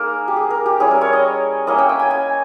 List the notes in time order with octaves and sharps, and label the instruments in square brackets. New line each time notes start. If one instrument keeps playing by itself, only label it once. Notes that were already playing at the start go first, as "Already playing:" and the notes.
Already playing: [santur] A#3 D#4 G#4 A#4
G4
G#4
A#4
G4
G3 C#4 E4 G#4
A#4
C#5
D#5
A#3 C#4 E4 D#5
G5
G5
G#5
G#5